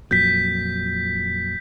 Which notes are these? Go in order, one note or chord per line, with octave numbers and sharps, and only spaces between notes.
F2 A#2 F#3 G6 B6